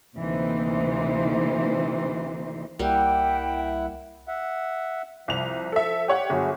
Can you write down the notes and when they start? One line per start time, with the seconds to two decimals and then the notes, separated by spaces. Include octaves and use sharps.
0.16 D2 C3 E3 A#3 D#4 C5
2.79 C2 G3 A#3 E4 E5 F#5 G5
4.28 E5 F#5
5.28 C2 F3 F7
5.72 A4 E5
6.08 G4 C#5 F#5
6.30 G1 F#3 F#4 G#4